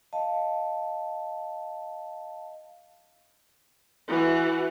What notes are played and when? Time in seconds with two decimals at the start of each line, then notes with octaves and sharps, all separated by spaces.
0.13 D#5 F5 A5
4.08 E3 F#4